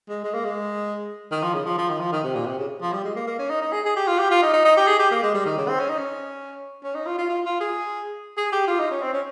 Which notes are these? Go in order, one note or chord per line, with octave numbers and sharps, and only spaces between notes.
G#3
G#3
A#3
G#3
D#3
F3
C#3
F3
F3
D#3
F3
D#3
C3
A#2
C3
C#3
F3
G3
G#3
A#3
A#3
C#4
D#4
D#4
G#4
G#4
G4
F4
G4
F4
D#4
D#4
D#4
G4
G#4
G4
A#3
G#3
G3
D#3
C#3
C4
C#4
D#4
C#4
C#4
D#4
F4
F4
F4
F4
G#4
G#4
G4
F4
D#4
C#4
C4
C#4